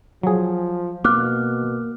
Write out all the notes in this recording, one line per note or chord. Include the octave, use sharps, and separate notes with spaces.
F3 F#3 G#4
B2 A#3 D6 F6 F#6